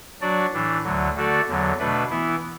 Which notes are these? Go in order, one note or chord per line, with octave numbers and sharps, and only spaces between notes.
F#3 D4 F#4 D5
A2 E3 D4
D2 D3 F#3
D3 A3 F#4 A4 D5
E2 D3 F#3
B2 A3 D4 B4
E3 B3 E4